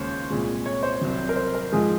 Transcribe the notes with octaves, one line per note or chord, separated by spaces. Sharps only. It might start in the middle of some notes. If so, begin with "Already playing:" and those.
Already playing: D#2 C#3 G#3 C5 C#5
C2 A#2 G#3
C#5
C5
C2 C3 F#3
A#4
C5
A#4
G#2 F3 G#3 G#4